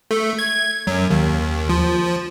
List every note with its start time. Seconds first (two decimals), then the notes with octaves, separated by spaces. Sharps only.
0.11 A3
0.39 G#6
0.87 F#2
1.10 D#2
1.70 F3